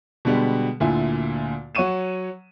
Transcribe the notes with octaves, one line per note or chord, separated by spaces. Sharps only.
B2 D3 G3 G#3 B3 G4
D2 A#2 D3 E4 G#5
F#3 C#5 F#5 C#6 D#7 E7